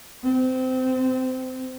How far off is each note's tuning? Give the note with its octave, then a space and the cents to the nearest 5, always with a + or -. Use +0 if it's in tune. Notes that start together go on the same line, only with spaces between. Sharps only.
C4 -25